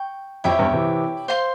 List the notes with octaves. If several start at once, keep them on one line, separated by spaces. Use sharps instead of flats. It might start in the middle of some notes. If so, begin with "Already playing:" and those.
Already playing: G5 C#6
F2 E4 G4 C#5 E5
E2 G2
C3 E3
C5 F5 C6